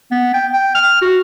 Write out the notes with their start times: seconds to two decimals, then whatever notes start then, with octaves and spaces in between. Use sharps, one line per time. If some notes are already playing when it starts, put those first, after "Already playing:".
0.11 B3
0.34 G5
0.54 G5
0.75 F6
1.02 F#4